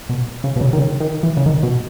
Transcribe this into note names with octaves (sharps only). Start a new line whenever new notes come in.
B2
C#3
B2
C#3
D#3
C#3
D#3
E3
C#3
D#3
B2